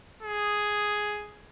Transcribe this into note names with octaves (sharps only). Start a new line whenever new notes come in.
G#4